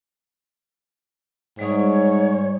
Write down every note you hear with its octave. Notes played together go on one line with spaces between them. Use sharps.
G#2 G3 C#5 D5 D#6